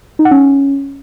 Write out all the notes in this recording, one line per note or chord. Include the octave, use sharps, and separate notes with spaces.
D#4
F#5
C#4